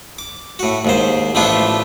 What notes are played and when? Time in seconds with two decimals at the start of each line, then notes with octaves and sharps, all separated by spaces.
0.19 D6
0.59 A2 F#4
0.85 D#2 G#2 C5
1.35 A1 F3 A3 B3 D4 F4